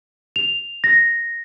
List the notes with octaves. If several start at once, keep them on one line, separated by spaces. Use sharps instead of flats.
F7
A#6